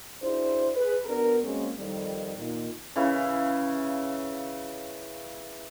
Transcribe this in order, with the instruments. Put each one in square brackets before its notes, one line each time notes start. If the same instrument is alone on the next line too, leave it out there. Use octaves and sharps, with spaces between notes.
[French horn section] D4 E4 F#4 G#4 C5
G#4 B4
B3 D4 F#4 A#4
F#3 G#3 A#3 C4 C#4
F2 D#3 G3
A#2 D#3
[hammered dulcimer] C#3 E3 E4 F5